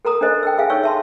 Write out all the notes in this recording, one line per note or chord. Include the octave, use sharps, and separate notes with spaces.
A4 A#4 A#5 D#6
D4 A4 C5 D#5
G5 A5 E6
G#4 E5 F5 G#5
D#4 A4 C#5 G5 C#6 E6
E5 A5 C6